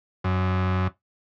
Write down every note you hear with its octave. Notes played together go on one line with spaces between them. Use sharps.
F#2